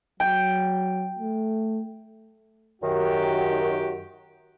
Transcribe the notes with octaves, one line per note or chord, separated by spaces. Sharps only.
F#3 G5
A3
F#2 D#3 F#4 G4